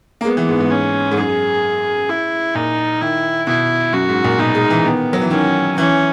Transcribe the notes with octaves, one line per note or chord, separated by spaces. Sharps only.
A#3
G#3 B3
E3
G#2
G#2
C#4
G#2
F#2 G#4
E4
A#2 D#4
D#3 E4
B2 E4
F#2 F#4
G#2
A#2
B2 D#4
G#3
E3
D#3 B3
F#3
E3
D#3 C#4
E3 C#4